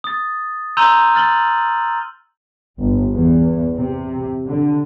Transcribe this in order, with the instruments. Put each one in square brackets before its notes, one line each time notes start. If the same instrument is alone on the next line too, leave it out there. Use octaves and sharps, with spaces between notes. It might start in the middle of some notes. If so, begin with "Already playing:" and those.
[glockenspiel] D#6 A6
A#5 C6 E6 G6 D#7 F7
F6 A6 F#7 G7
[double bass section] G1
E2
C3
D3